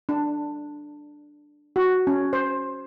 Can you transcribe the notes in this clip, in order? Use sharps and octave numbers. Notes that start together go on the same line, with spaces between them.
D4
F#4
C#4
C5